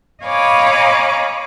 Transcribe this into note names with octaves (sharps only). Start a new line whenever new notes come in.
C#5 D#5 F5 G#5 B5 D6